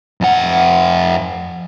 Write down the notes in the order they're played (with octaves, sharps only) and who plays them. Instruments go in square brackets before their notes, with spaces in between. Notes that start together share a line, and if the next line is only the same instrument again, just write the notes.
[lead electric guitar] F2 F#5